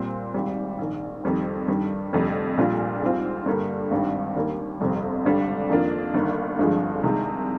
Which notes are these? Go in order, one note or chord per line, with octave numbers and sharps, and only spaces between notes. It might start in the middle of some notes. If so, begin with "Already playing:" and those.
Already playing: A#2 G3 C4
G#1 G#2 G3
A#1 G#2 D#3
F2 D#3 G3 C4
G2 D#3 G3
F1 F2 D3 G3
A#1 A#2 G3 D4 F4
G#2 G3 C4 F4
G2 D3 G3 A#3
G#1 G2 D#3 G3
D#2 D#3 G3 A#3
G1 F2 C3 G3 C4
G#1 G2 D3 G3 D4
F2 D#3 A#3 D4 F4
G1 G2 D#3 A#3
G#1 G2 D3 F3 G#3
C2 C3 D#3 G#3